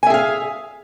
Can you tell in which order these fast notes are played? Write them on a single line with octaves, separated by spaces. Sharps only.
G#5 E5 G#4 F5